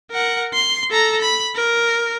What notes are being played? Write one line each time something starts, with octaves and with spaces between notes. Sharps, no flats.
A#4 F#5
C6
A4 A#5
B5
A#4